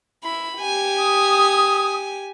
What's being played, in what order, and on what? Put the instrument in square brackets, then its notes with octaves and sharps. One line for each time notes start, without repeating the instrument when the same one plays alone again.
[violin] E4 B5
G4 G#5
[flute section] D#6